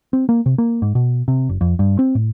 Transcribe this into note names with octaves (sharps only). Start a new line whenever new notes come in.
C4
A#3
C3
A#3
G#2
B2
C3
F#1
F2
G2
C4
A2